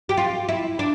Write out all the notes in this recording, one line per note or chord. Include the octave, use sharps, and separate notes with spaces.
G4
F4
E4
D4